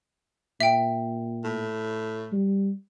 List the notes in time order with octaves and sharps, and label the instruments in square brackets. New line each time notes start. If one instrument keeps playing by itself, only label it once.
[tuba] A#2 [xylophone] E5 G5
[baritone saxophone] A2
[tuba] G3